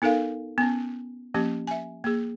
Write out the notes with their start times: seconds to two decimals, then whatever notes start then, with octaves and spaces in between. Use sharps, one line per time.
0.02 B3 D#4 A4 A#4 F5
0.58 B3 C#4
1.34 F3 A#3 C#4 G4
1.67 E5 G#5
2.04 A#3 G#4